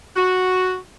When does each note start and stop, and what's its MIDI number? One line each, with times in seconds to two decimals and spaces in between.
0.16 0.76 66